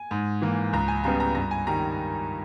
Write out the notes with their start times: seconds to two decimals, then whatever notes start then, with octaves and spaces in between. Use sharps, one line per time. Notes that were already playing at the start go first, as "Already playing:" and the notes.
Already playing: G#5
0.11 G#2
0.42 E3 A#3
0.73 C#2 A#5
0.88 G#5
1.04 C#3 G3 B3 A#5
1.20 A#5
1.35 G2 A#5
1.51 G#5
1.67 D#3 G3 A#5